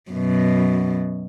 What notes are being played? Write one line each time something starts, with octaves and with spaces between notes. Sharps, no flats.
F#2 B2